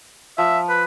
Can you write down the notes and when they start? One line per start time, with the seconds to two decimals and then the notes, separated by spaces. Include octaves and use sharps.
0.38 F3 E5
0.69 B4